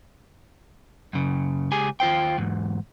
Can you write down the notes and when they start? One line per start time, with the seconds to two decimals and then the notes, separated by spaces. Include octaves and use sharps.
1.13 F#2 C#3
1.71 C#2 G4 G#4 G#5
2.00 D#2 F4 C5 G5
2.38 E2 G#2